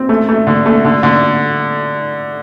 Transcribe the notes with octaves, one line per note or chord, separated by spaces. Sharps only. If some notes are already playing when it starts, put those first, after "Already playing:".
Already playing: C4
A3
A3
D3
A3
D3
D3